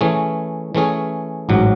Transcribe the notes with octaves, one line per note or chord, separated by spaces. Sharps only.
E3 A3 C#4 G#4
E3 A3 C#4 G#4
A1 G#2 F#3